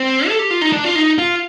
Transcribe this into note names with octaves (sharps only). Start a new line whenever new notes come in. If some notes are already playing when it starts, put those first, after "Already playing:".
Already playing: C4
A4
G4
F4
D#4
D4
F4
D#4
F4